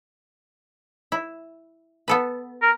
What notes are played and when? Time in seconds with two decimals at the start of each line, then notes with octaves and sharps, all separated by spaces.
1.12 E4
2.08 B3 A4 B4
2.62 A#4